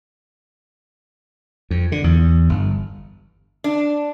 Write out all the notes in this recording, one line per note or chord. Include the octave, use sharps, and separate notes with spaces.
F2
D3
E2
G1
D4